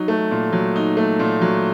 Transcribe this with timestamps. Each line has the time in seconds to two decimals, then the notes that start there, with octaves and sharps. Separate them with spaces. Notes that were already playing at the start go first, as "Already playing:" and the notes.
Already playing: F#3 D#4
0.08 A3
0.31 A#2
0.52 F#3
0.76 D#4
0.97 A3
1.19 A#2
1.41 F#3